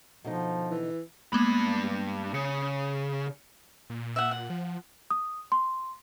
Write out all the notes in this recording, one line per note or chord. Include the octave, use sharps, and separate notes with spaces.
B2 D3 F3 D#4
E3
G2 G#3 A#3 B3 B5
C#3 C#7
A#2
E5 F#5
F#5
F3
D#6
C6